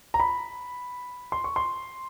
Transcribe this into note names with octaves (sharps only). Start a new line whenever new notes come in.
A#5
B5
C6
C#6
C6